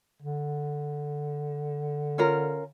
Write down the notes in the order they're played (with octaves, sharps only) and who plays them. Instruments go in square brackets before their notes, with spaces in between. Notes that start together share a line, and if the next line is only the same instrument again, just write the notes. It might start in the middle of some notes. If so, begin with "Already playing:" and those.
[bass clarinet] D3
[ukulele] C#4 F4 A#4